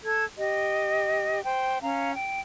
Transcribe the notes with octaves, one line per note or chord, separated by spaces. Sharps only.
A4 G#6
G4 D#5
C5 G5
C#4 F5 A#5
G5